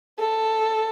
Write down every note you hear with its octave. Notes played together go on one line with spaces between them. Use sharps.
A4